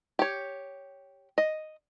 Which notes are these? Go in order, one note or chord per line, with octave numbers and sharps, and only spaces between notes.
G4 C#5
D#5